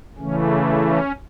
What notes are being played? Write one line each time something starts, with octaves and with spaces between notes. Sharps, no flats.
C#3 E3 A3 C#4
C#4